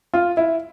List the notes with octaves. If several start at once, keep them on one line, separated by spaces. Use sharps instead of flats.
F4
E4